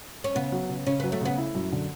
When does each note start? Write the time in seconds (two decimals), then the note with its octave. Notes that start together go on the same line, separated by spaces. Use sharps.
0.24 C#4
0.35 C#3 B3
0.52 F#3
0.69 C#3
0.87 C#3 C#4
1.00 F#3 B3
1.12 A3
1.21 C#3 B3
1.38 E4
1.55 F#2
1.72 D3